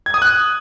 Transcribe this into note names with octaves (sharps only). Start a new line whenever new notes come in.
G#6
D#6
F#6